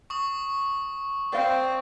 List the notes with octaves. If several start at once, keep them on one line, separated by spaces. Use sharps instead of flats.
C#6 D#6
C4 D5 F5